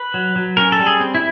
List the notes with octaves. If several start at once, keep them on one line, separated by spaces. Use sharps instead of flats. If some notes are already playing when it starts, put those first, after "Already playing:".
Already playing: B4
F#3
F#3
C#4 A#4
A4
G3
G#4
C4
E4